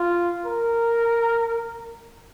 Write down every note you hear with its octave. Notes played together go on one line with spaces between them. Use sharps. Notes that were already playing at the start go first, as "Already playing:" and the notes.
Already playing: F4
A#4